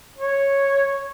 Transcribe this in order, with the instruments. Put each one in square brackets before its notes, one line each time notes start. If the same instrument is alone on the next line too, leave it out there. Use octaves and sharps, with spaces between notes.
[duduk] C#5